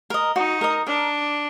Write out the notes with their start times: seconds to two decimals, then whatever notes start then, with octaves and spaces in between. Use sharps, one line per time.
0.10 A#4 D#5
0.36 D#4 F#4
0.61 A#4 D#5
0.87 D4 A#4